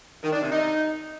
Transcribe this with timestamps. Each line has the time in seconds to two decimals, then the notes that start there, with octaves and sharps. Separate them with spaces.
0.22 D#3
0.32 D4
0.42 C3
0.51 D#4